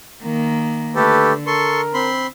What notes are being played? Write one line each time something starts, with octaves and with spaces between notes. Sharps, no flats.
D#3 A#3
D3 A3 G4 A4 B4
A4 A#4 C6 C#6
C4 B5 C6